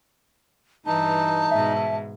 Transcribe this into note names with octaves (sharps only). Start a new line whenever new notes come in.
G2 E3 D#4 A5
G#2 B2 E5